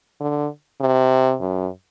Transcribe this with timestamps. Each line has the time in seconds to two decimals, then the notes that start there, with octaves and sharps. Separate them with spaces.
0.20 D3
0.81 C3
1.41 F#2